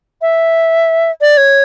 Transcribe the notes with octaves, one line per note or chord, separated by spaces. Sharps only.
E5
D5
C#5